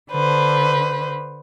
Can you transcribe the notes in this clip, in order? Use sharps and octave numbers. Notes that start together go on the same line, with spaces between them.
D3 B4 C5